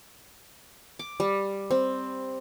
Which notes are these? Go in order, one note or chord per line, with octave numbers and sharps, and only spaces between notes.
D6
G3
C4